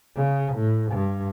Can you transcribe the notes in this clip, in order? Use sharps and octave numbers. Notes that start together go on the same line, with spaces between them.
C#3
A2
G2